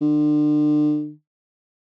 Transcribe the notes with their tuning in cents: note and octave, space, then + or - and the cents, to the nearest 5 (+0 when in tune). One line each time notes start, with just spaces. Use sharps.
D3 +35